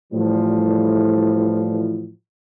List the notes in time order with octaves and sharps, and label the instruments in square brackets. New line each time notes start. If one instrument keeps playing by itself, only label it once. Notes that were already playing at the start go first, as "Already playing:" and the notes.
[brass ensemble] A2 E3 F3 G3